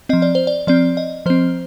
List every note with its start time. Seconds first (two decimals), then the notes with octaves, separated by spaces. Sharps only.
0.09 F3 C4 D#5
0.22 D5
0.35 C5
0.47 D5
0.67 F3 C4 D5
0.97 D#5
1.26 F3 C4 C5